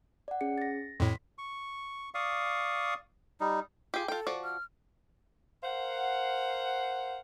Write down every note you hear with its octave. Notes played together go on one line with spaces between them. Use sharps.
D5 F#5
C#4 G#4 C#7
A6 A#6
F2 A2 C6 B6
C#6
D5 F5 C#6 D#6
G3 D#4
F4 G4 G#4
F4 A4 G5
F3 F#4 D5
F6
A#4 C5 F5 F#5